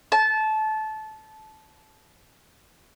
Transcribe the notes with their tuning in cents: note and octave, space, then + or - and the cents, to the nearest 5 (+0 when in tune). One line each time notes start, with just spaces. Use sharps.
A5 -20